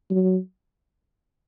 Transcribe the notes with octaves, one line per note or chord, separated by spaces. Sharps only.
F#3